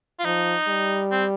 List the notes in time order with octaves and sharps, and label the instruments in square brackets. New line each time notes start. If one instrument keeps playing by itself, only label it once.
[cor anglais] F4
[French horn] F3 [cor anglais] D#4
[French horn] G3
[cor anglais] C4